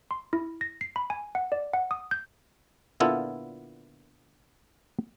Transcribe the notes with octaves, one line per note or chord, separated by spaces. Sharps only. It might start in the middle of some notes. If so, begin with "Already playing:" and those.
C6
E4
A#6
C7
B5
G#5
F#5
D5
F#5
D#6
G6
A#2 D3 B3 E4 F4 A4